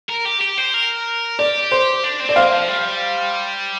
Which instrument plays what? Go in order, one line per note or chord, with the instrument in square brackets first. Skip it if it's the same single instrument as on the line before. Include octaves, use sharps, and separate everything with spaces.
[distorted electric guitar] A#4
G4
G4
C5
A#4
[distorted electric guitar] G4 [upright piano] D5
[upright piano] C5
[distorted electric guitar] D4
C4
[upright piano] D5
[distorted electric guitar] A#3 [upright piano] C5 F5
[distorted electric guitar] F3
G3